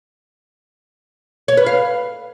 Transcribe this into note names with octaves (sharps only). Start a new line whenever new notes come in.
C#5
B4
F5